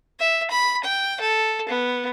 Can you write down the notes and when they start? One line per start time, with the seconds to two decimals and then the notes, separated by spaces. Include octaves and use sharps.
0.20 E5
0.51 B5
0.84 G5
1.21 A4
1.69 B3